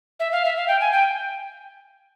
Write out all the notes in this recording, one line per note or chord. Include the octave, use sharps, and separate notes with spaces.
E5
F5
E5
F5
G5
G#5
G5